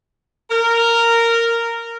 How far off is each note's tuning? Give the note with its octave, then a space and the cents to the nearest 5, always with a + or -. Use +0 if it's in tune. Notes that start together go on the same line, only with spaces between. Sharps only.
A#4 -10